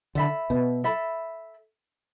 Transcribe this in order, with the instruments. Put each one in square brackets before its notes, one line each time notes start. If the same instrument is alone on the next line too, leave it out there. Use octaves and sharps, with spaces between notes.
[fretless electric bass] D3 [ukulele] A4 E5 B5
[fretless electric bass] B2
[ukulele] A4 E5 B5